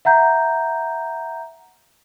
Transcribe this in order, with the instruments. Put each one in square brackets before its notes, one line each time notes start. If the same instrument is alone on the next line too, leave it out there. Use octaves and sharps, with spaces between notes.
[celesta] E5 F#5 A#5 G6